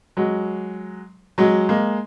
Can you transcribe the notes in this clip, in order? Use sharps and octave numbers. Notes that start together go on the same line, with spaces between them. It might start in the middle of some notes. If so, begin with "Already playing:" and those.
F#3 G#3
F#3 G#3
G#3 A#3